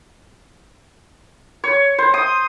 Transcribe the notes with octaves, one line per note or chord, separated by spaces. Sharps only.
C#5
C5
D#6